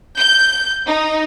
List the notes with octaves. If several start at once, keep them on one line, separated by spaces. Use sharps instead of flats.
G6
D#4